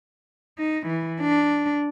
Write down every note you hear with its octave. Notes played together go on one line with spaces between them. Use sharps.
D#4
E3
D4